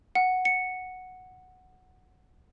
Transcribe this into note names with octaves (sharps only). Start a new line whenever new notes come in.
F#5
C#7